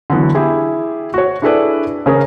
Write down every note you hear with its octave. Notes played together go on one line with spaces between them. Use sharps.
D3 E3 F#3 B3
E4 G4 G#4
F#4 C#5
D4 E4 G#4 A4 B4 D5
C#3 C#4 G#4 A#4